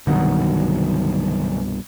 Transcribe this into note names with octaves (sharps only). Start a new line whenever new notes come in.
C2 G2 B2 D3 D#3 F#3 D#4 F#5